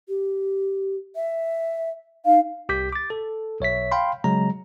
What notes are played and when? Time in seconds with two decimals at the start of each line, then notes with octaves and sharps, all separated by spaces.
0.09 G4
1.16 E5
2.26 D#4 F5
2.69 C2 G4 D6 G6 B6
2.92 D6 A6
3.10 A4
3.60 B1 C#5 E5 B6
3.92 F5 G5 B5 C6
4.24 C#3 F#3 G#3 A#5